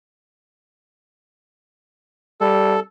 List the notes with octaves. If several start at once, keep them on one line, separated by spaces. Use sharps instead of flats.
G3 A4